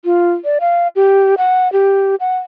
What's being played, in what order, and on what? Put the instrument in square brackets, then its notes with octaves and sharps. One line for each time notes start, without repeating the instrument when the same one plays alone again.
[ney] F4
D5
F5
G4
F#5
G4
F#5